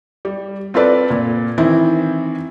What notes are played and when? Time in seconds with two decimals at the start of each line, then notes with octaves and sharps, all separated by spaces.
0.25 G3
0.74 C4 F4 A4 B4 D5
1.10 A#2
1.58 D#3 E3 C4 E4